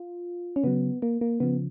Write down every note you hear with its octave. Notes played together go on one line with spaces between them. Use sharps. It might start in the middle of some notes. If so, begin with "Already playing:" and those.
Already playing: F4
C#4
C#3 F#3 B3
A#3
A#3
C#3 F3 B3